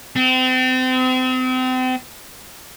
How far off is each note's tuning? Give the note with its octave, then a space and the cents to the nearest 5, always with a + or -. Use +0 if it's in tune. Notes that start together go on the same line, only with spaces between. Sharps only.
C4 -35